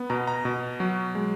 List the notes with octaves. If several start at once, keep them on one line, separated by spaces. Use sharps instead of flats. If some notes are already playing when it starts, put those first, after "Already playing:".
Already playing: B3
B2 A#5
A#5
B2
F#3
G#3